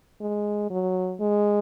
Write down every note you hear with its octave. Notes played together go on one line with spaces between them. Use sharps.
G#3
F#3
G#3